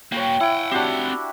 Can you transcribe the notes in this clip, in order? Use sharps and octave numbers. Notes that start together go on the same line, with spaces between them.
A#3 F#4 C#5 G5
E4 F#5 G5
C4 D4 F#4 G4 F#5